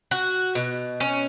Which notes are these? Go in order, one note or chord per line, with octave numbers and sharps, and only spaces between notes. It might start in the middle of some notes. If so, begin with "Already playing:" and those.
F#4
B2
C#4